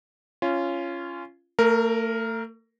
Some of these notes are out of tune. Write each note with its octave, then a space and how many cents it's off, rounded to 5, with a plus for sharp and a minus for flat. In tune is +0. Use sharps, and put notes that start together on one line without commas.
C#4 +0 F4 -20
A3 +40 A#4 +0